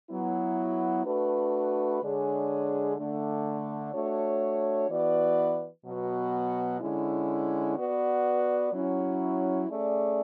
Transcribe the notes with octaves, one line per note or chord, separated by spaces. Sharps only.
F#3 B3 E4
A3 D4 F#4 B4
D3 G#3 D4 G#4 C#5
D3 A3 D4
A3 D4 F#4 C#5
E3 B3 F#4 B4 D5
B2 F#3 B3 F#4
D3 G#3 C#4 E4
B3 F#4 B4 D5
F#3 C#4 E4
A3 C#4 G#4 D5